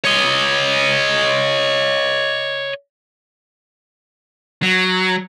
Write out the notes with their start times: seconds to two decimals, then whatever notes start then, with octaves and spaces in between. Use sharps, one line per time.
0.04 C#5 D#5
4.62 F#3